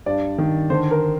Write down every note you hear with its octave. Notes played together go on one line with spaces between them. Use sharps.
G2 D5
D#3
D3 C5
A#4